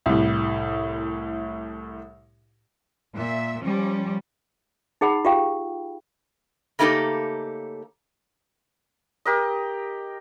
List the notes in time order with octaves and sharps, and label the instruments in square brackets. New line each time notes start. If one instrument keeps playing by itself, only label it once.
[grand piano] C2 A2
[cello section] A#2 E5
F3 G3 C#4
[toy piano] D#4 G#4 F#5 B5
F4 G4 F5 G5
[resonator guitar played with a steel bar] C#3 A3 A#3 D#4 G4 A4
[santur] G4 A#4 D#5